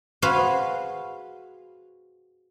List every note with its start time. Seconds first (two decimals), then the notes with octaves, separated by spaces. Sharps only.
0.22 F#4 G#4 B4 C5 F5